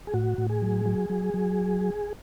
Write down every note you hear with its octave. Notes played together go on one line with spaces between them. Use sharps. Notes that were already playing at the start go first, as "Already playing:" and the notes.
G#4
A2 F#4
A2
G#4
F#3
F#3
F#3
F#3